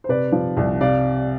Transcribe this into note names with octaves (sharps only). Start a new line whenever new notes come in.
C5
C3 B4 D5
F3
C2
C3 D5 F5